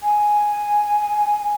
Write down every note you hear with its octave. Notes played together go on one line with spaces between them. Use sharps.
G#5